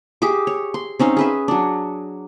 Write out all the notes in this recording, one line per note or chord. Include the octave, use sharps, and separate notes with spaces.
G4 G#4 E5 D6
C#5
C6
C4 C#4 D#4 F5
G#4 B4 E5
F#3 D4